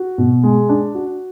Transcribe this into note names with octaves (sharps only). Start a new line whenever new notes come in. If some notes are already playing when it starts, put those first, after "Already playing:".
Already playing: F#4
B2
G#3
D4
F#4